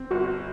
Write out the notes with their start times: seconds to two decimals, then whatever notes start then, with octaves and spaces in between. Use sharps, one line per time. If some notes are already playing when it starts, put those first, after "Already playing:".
Already playing: C4
0.11 G1 F#4